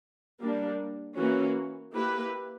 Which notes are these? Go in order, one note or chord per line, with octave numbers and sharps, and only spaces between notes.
G3 A#3 D4
E3 A#3 C#4 F#4
A#3 E4 G4 B4